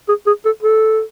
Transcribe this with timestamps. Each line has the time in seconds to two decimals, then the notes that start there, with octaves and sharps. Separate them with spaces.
0.08 G#4
0.27 G#4
0.45 A4
0.63 A4